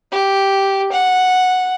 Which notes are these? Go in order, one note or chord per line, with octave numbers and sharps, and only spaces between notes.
G4
F#5